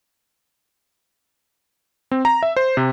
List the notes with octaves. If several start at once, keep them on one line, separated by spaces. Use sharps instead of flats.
C4
A#5
E5
C5
C3